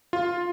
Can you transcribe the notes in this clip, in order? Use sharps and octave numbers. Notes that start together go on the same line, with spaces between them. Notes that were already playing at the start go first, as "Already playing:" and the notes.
F4